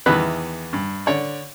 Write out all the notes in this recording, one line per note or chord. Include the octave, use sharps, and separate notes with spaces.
E2 D#3 E3 B3 B5 F#6
G2
D3 C#5 D5